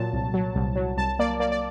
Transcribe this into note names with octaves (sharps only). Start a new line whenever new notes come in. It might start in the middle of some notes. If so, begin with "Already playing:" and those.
Already playing: A#2 F#3 A5
C2
F#3
C2
F#3
C2 A5
A#3 D5
A#3 D5
D5